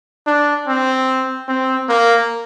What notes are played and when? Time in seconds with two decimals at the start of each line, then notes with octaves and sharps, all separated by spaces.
0.27 D4
0.68 C4
1.48 C4
1.89 A#3